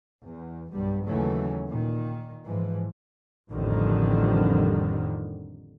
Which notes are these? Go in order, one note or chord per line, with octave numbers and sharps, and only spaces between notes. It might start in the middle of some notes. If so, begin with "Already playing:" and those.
E2
B1 G2 G3
D#2 C#3 E3 F#3 A3 C#4
A#2 D#3
G#2 E3 F3
A1 F2 D3 D#3 F3 G3